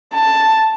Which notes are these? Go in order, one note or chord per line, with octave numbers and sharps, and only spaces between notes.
A5